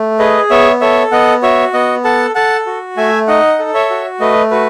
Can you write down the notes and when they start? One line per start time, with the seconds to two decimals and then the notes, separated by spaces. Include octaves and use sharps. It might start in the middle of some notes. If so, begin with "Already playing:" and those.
Already playing: A3
0.19 G#4 B4 D#5
0.50 B3 C#5 E5
0.81 A4 C#5 E5
1.11 B3 D#5 F#5
1.43 F#4 C#5 E5
1.73 B3 D#5 F#5
2.04 A4 F#5 A5
2.35 A4 F#5 A5
2.66 F#4
2.97 A3 E5 G#5
3.27 D#4 D#5 F#5
3.59 A4
3.74 C#5 E5
3.90 F#4
4.20 A3 B4 D#5
4.51 F#4 B4